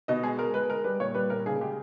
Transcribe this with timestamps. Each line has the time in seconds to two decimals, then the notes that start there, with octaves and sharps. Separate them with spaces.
0.08 B2 D#5
0.23 G#3 G#4
0.39 G#3 A#4
0.54 G#3 B4
0.69 G#3 A#4
0.84 G3 B4
1.00 A#2 C#5
1.15 G3 B4
1.30 A#2 A#4
1.46 C#3 G#4
1.60 G#3 G4